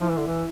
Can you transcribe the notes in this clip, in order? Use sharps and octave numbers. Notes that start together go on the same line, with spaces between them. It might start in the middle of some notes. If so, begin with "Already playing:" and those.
F3 E4
E3
D3
E3